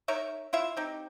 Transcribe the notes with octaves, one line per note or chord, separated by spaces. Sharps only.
D#4 A#4 C#5 E5
E4 F4 E5
C4 D#4 G4